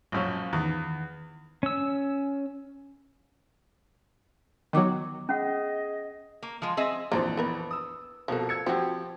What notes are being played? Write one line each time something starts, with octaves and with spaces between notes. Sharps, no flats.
A#1 F#2 C#4
E2 D#3
C#4 E6
D#3 F#3 B3 D6
C#4 G#4 D#5 F#5
A#3
F3 G#3
C4 G#4 D#5 E5
A#1 F2 E3 A#3 F4 C5
B3 A#4 B4
D#6 E6
C2 B2 F3 A#3 A4
E6 G#6 C#7
F3 C4 F#4 G4